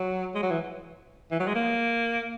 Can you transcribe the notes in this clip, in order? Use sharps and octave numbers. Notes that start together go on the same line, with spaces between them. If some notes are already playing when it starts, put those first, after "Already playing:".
Already playing: F#3
G#3
F#3
E3
E3
F#3
G#3
A#3